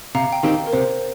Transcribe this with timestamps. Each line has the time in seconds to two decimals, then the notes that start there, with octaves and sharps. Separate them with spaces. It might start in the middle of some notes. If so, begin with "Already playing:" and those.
0.15 C3 F5 A#5
0.33 G5
0.43 D#3 C4 D#4 G4 F5
0.67 A#4
0.73 C3 C5